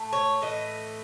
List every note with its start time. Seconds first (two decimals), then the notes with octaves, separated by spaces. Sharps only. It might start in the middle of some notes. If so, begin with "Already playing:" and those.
Already playing: A2 A3
0.13 C#5
0.42 A2 E3 A3 D#5